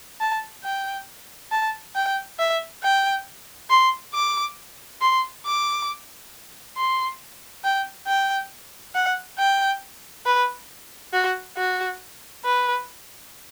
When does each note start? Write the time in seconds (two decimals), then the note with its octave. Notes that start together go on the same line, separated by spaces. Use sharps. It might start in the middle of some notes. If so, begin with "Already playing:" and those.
0.21 A5
0.64 G5
1.51 A5
1.95 G5
2.39 E5
2.83 G5
3.70 C6
4.14 D6
5.01 C6
5.45 D6
6.77 C6
7.64 G5
8.07 G5
8.95 F#5
9.38 G5
10.26 B4
11.13 F#4
11.57 F#4
12.45 B4